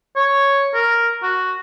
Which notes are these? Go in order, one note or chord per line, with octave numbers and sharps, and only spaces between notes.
C#5
A#4
F#4